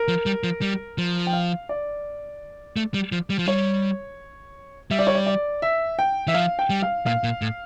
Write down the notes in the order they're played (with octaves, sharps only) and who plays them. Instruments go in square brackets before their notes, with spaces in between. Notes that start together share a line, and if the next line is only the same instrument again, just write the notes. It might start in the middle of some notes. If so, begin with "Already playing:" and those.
Already playing: [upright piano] A#4
[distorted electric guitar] F3
G3
F3
G3
F3
[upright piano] G5
F5
D5
[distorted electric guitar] A3
G3
F3
G3
F3
[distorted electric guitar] G3 [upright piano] C#5
[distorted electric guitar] G3 [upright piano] E5
[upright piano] D5
C#5
D5
D5
E5
G5
[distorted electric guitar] E3 [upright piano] E5
[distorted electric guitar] F3 [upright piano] F5
[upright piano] G5
[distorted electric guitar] G3
[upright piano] F5
[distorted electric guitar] A#2 [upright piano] F5
[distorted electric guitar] A#2
A2